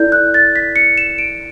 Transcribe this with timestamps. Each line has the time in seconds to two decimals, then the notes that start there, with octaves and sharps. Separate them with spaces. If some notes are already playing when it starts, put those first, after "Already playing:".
Already playing: E4 A4 D5 G6
0.12 F#6
0.34 A6
0.56 B6
0.76 C#7
0.98 E7
1.18 D7